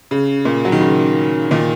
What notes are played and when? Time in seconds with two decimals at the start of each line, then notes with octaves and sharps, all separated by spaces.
0.11 C#3
0.45 A#2
0.65 F#3
0.72 D#3
0.81 C#3
1.51 A#2 D#3